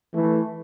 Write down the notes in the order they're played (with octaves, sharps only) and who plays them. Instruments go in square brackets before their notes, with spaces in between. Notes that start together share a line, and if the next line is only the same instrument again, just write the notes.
[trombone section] E3 A3